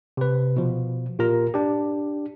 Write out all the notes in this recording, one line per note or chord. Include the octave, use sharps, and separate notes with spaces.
C3 B4
B2 F3
A#2 F4 G4 A#4 A#5
D4 G4